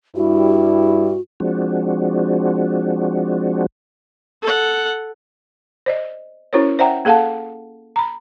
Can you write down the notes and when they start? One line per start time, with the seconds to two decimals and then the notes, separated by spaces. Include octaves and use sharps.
0.16 G2 G3 E4 F#4
1.40 F3 G#3 C4 D4 F#4
4.42 A4 F#5
5.86 C5 D5 D#5
6.53 C#4 E4 F#4 A#4 C5 C#5
6.79 C5 D5 E5 F#5 G5 A#5
7.05 A#3 G#4 A4 F5 F#5 A5
7.96 A#5 B5